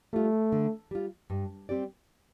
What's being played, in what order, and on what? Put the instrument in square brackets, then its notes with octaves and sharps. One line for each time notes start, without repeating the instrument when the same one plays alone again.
[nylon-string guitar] G3 F4 [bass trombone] A3
[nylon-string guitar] D3
G3 F4
G2
G3 C4 G4 D5